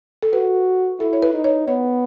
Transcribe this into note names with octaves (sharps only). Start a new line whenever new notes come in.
A4
F#4 B4
E4 A4
C#5
B4
D#4
C#5
B3 C#5